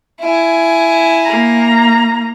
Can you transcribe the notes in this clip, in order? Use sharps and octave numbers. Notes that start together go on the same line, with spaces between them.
E4 G#5
A#3 A#5